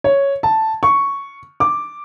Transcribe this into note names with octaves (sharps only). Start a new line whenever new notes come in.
C#5
A5
C#6
D6